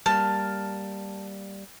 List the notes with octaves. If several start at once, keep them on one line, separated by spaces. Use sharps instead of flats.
G3 A#3 A5 F6